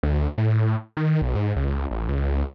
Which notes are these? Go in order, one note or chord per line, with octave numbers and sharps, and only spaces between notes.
D2
A2
D#3
B1
G#2
C#2
A1
C#2